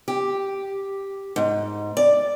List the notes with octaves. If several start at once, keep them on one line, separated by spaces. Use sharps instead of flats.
G4
G#2
D5